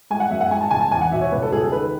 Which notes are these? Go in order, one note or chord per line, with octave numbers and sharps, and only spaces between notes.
G#3 G#5
F#5
F#2 E5
F#5
G#3 G#5
A5
C#2 G#5
A5
E2 G#5
F#5
B2 E5
C#5
C#2 B4
A4
C#2 G#4
A4
D#3 B4